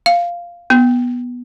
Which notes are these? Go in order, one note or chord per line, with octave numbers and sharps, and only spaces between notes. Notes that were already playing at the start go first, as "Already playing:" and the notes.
F5
B3